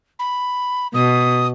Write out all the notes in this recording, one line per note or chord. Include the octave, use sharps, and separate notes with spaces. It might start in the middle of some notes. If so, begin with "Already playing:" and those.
B5
B2 D#6